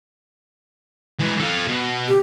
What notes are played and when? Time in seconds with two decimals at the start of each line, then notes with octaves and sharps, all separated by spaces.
1.20 E3 G#3
1.40 F4 A4
1.68 B2
2.08 G4